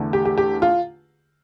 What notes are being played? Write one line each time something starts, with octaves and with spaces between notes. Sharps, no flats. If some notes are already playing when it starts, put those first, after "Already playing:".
Already playing: E2 D3 A3
G4
G4
G4
F4